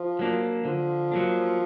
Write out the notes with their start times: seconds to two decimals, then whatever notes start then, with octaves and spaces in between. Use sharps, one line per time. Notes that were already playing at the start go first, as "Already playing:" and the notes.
Already playing: F3
0.19 F#3 A#3 D4
0.65 D3 F3
1.12 F#3 A#3 D4